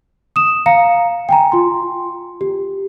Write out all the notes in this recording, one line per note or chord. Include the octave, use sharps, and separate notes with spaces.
D#6 E7
F5 A#5 C#7
G5 G#5 A#5
F4 C6
G4